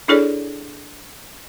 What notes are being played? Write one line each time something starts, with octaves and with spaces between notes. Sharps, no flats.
D4 E4 G#4 A4 C#5 D5